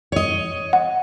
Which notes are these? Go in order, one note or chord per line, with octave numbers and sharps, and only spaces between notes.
C#5 D#5
F#5